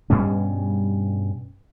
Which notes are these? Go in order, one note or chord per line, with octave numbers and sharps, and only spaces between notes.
G2 B2 G3 C#4